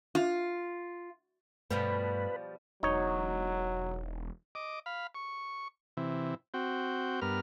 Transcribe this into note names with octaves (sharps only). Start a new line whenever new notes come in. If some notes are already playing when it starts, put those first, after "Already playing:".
F4
G2 B2 F3 G3 A3 B4
E1 F#3 D#4 C#5
D#5 D6
F5 B5
C#6
C3 E3
C4 F#4 G5
G2 B3 A#4 F6